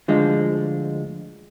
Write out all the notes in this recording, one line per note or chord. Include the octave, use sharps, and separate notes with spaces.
D2 D3 F3 G#3